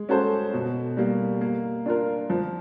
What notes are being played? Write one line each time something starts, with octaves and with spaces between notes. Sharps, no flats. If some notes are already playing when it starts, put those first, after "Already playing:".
Already playing: G#3
C#4 F#4 A4 C5
B2
G3 A#3
A#3
D4 F4 A#4
F3